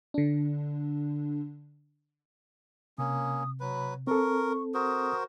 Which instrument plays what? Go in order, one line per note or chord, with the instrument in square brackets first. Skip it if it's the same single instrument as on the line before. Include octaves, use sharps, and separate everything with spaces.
[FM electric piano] D3 D4
[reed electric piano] C3 [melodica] A#3 C#4 [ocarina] D#6
[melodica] F#3 B4 [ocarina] B5
[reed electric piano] C4 A4 [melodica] A#4 [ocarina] C#6
[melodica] F#4 A#4 C5 [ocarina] D#6